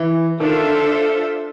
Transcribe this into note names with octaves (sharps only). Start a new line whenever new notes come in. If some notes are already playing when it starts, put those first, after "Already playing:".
Already playing: E3
D#3 D4 F4 A4 C5 E5
D3